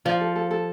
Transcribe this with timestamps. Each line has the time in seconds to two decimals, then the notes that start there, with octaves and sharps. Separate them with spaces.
0.05 F3 D5
0.21 A4
0.36 A4
0.51 A4